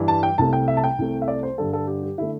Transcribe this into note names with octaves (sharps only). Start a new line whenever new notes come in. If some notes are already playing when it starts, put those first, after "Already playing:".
Already playing: G2 E3 G3
A5
G5
C2 C3 A3 A5
G5
E5
A5
G5
C2 C3 A3
E5
D5
C5
G2 D3 G3 A4
A4
G4
G4
D3 A3 E4